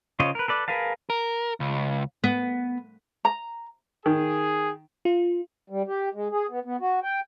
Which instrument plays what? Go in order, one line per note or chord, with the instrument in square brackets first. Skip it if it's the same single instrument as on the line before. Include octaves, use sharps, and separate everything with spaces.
[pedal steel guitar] C#3 F4 C5 C#5 D#5
A#4 B4
A4 B4 D5
G#4 A#4 B4 F5 A5
[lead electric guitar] A#4
C#2
[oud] B3
[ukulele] A#5
[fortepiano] D#3 [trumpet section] G#4
[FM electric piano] F4
[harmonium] G3
G4
G#3
G#4
B3
B3
F#4
G5